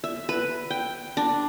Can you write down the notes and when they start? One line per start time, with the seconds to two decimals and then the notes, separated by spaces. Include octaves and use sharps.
0.04 E5
0.29 B4
0.70 G5
1.17 D4